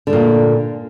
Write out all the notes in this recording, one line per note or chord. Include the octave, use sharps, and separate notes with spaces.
A#2 D3 A3